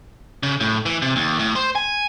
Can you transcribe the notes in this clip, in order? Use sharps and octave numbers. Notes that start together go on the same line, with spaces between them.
C#3
A2
E3
C3
D#2
A2
C5
G#5